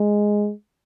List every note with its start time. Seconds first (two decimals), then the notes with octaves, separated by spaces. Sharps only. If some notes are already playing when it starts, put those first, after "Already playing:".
Already playing: G#3